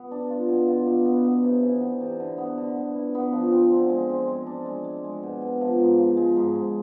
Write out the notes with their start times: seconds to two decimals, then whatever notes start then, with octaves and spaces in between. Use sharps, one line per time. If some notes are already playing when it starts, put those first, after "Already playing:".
Already playing: B3
0.11 D4
0.30 F4
0.49 B2
0.68 F4
0.87 B2
1.05 B3
1.24 B3
1.43 C3
1.63 E3
1.81 B3
2.01 C3
2.20 D3
2.38 B3
2.58 D3
2.76 B3
2.95 E4
3.15 B3
3.33 F3
3.52 C4
3.72 D3
3.89 G#3
4.09 C4
4.28 G#3
4.47 D4
4.65 G#3
4.84 G#3
5.04 G#3
5.23 B2
5.41 B2
5.61 F3
5.80 G#2
5.98 F3
6.17 G#3
6.36 G#2
6.55 G#2